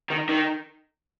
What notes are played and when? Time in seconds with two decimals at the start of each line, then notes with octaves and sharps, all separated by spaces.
0.10 D#3
0.29 D#3